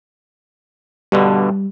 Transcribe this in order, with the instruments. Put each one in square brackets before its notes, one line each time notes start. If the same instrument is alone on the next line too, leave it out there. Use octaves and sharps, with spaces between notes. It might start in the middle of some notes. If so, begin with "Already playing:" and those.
[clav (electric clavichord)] G2 B2 D3 [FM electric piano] G3